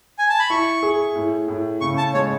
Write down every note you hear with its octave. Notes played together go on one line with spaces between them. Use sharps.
G#5
A5
B5
E4 C#6
G#4
A2
A2
C#3 C#6
A5
G#3 C#5